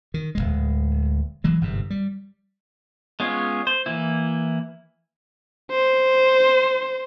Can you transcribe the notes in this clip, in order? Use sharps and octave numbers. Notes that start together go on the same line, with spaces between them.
D#3
D1 G#1 G#3
E3 F#3 G#3
G1 G#2 C3
G3
G#3 B3 C#4 F4 C#5
C5
E3 A#3 E4
C5